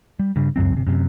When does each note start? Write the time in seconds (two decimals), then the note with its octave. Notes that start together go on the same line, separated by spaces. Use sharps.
0.19 G3
0.36 G2 C#3 G3
0.56 C#2 F#2 F#3 C4
0.73 G1 C3
0.87 F#2 C3